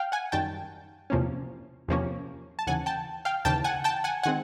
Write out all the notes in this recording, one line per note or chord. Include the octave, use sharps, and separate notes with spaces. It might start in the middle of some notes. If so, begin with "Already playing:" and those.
Already playing: F5 G5
F#5 G#5
F#2 D#3 G3 G5 A5
E2 C3 F3 A#3 C#4
E2 C3 F3 A#3 C#4
A5
D#2 C#3 E3 F#5 G#5
G5 A5
F5 G5
D#2 C#3 E3 G5 A5
F#5 G#5
G5 A5
F#5 G#5
D#3 G#3 C4 F#5 G#5